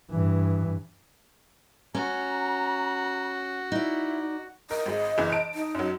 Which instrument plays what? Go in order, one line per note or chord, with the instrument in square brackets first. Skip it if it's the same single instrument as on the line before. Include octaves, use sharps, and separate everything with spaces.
[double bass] G2 E3
[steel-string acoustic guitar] C#4 [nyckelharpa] F#4 [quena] A#5
[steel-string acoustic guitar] D#4 D5 [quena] E4
[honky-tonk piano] A#4 [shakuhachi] D#5
[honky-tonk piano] G#1 G#3
F#1 E3
A5 D7
[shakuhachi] D#4
[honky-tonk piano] F#2 F#3